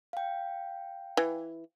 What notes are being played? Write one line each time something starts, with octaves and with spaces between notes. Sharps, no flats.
F5 G5
E3